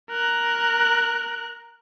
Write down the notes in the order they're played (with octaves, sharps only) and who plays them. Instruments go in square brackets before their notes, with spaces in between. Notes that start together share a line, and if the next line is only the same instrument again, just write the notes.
[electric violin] A#4 F#6